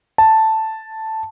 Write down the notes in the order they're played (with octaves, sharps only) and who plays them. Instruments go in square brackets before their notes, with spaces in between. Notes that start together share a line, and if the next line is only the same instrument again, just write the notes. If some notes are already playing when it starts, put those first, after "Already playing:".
[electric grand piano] A5